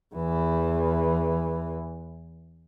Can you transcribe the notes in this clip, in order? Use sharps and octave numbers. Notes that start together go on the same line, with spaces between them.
E2 E3